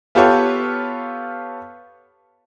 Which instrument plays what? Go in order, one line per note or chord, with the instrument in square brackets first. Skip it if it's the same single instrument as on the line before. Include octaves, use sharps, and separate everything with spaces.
[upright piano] B3 F4 G4 A4 B4 C#5